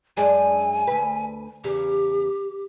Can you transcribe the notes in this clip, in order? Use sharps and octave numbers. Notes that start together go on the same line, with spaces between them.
F#2 G#3 D4 G#5
D2 B4
E2 C#3 G4